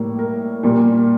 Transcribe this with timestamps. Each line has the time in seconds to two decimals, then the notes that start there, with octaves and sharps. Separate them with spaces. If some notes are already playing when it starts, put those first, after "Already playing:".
Already playing: A2 G3 A#3
0.19 A#4
0.63 A#2 G3 A#3